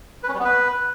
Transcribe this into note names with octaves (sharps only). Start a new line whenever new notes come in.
B4
C#4
G3
B3
B4